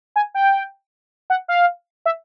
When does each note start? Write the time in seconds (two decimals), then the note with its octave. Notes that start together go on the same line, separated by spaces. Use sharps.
0.16 G#5
0.35 G5
1.30 F#5
1.48 F5
2.06 E5